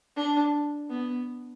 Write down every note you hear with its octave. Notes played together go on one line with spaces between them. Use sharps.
D4
B3